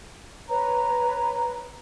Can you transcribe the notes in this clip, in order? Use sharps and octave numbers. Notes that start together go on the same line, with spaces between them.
B4 C#5 A#5